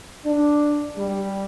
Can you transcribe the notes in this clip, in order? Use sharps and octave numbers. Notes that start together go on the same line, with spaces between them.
D4
G3